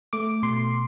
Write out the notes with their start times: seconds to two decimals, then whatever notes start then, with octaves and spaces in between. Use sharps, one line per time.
0.13 A3 D6
0.43 B2 C6